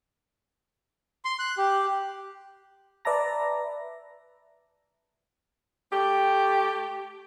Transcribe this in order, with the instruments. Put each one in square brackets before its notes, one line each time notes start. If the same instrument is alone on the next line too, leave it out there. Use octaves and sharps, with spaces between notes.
[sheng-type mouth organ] C6
F#6
G4
[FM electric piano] B4 D5 E5 A5 A#5 A#6
[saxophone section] A3 G4